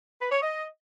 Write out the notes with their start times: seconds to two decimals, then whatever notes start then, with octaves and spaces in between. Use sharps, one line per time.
0.20 B4
0.31 C#5
0.42 D#5